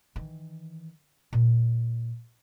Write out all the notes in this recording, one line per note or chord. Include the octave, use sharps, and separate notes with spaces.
D#3 E3
A#2